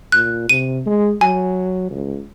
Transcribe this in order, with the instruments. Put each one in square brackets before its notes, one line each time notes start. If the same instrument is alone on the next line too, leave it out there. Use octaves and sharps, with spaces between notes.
[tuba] A#2 [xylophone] F#6
[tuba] C3 [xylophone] D#7
[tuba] G#3
[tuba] F#3 [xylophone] G#5
[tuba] C#2